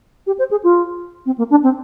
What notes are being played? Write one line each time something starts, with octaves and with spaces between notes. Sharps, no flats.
G4
C5
G#4
F4
C4
A#3
D4
C4